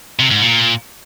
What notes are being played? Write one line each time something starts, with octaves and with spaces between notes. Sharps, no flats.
C3
G#2
A#2